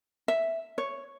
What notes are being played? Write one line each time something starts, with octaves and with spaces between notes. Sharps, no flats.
E5
C#5